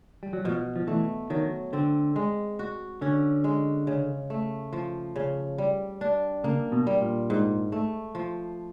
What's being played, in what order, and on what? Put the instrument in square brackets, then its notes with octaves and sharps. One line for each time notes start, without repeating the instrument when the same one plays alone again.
[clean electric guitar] G3
F#3
[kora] B2 [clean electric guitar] F3
[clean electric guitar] F3
[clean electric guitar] E3 [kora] A3
[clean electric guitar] D#3 [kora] F#3
[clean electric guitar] D3 [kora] C4
[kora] G#3
F#4
[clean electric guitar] D3 [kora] C#4
[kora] G#3
C#3
A3
F3
C#3
G3
D4
[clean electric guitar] C#3 [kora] A#3
[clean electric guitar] B2
[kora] G3
[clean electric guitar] A#2
[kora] G#2
A3
F3